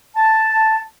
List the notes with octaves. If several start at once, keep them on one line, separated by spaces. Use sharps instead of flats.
A5